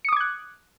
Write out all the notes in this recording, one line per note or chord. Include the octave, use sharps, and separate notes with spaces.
D6 D#6 F#6 G#6 C#7